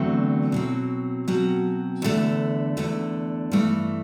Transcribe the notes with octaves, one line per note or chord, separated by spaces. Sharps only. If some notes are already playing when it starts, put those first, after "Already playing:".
Already playing: E2 D3 F#3 A3 C4
B2 F#3 C4
B2 F#3 C4
E2 D3 A3
E2 D3 A3
G2 E3 A3